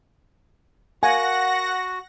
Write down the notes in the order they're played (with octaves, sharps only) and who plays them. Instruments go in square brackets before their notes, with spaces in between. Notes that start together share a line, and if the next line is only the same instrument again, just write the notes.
[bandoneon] F#4 [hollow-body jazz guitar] A#4 F5 [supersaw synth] F#5 A#6 [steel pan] G#5